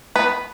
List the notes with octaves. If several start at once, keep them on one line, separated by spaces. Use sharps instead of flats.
B3 B4